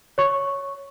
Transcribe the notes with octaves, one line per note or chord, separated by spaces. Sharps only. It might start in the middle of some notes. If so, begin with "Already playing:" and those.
C#5 C#6